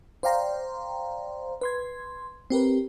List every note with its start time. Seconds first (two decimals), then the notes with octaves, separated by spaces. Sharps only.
0.23 C5 D5 F5 G5 A#5 C6
1.61 B4 C6 G#6
2.50 C4 G4 A#4 B4